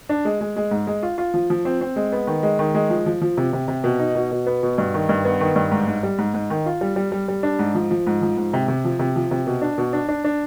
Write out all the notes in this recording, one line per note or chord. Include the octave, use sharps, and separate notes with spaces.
D4
G#3
G#3
G#3
G#2
G#3
F4
F4
F3
F3
C4
C4
G#3
B3
D#3
G#3
D#3
G#3
F3
F3
F3
C3
C3
C3
B2
D#4
B2
B2
B3
B2
G2
D#3
G2
B3
D#3
G2
G#2
G#2
G3
G#2
G#2
D#3
F4
G3
G3
G3
G3
D4
G#2
F3
F3
G#2
F3
G#2
C3
C3
F3
C3
F3
C3
B2
D4
B2
D4
D4
D4